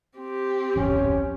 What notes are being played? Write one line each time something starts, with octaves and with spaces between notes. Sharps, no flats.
C4 G4
D1 G#1 F2 C#4